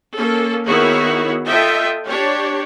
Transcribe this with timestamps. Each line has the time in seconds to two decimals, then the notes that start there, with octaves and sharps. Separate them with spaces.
0.17 A#3 C#4 A4
0.65 D#3 B3 E4 F#4 G#4 C#5
1.47 F4 A4 D#5 E5 G5
2.06 D4 G4 C#5